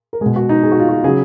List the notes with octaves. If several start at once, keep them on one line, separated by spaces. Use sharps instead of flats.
A#4
B2 G#3 G#4
F#4
D#4
G#4
F#4
F4
F#4
C#3 F#3 G#4